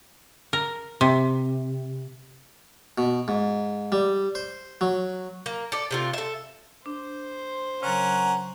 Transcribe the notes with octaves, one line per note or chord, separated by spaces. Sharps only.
A#4
C3
B2
G#2
G3
C5
F#3
A#3
A4 D5
C3 A3 F4
A4 E5
D4 C5
C#3 F#3 C#4 A#4 F#5